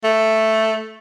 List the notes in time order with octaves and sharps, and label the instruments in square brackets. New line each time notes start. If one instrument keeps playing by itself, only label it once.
[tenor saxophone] A3